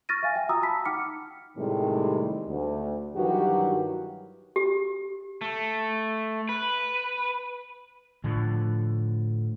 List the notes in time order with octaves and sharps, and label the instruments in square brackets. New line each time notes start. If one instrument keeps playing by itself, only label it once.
[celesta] C#6 F6 A6 A#6 D#7
E5 F5 G#5
E5 G5
F4 F#4 A#5 D#6 E6
A5 B5 B6
D#4 F#5 G5 D6 F6 C#7
[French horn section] A2 C3 D#3 G3 G#3
D2
G2 D#3 E3 F#3 F#4 G4
[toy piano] G4
[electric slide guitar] A3
B4
[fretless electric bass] A2 D3 F3